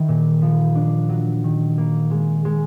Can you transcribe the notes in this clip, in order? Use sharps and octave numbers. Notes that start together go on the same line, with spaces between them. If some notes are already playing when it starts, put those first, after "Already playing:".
Already playing: D#3 E4
A#2
F3
D4
F#3
D#3
A#3
G#3
G#3